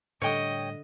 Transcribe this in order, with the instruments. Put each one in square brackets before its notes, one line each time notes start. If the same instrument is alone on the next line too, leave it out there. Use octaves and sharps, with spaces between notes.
[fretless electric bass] A2 G3 [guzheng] D3 [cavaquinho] C#5 G5 D#6 [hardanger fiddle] D#5